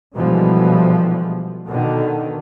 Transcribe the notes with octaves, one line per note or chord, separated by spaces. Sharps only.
B2 D3 E3 F3 G3 G#3
B2 D3 D#3